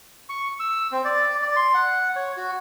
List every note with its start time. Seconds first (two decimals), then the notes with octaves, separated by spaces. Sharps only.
0.29 C#6
0.60 E6
0.92 C4
1.05 D5
1.42 D5
1.56 C6
1.74 F#5
2.16 C#5
2.37 F#4